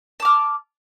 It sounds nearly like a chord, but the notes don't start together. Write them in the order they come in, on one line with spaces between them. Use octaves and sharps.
A5 D6 F6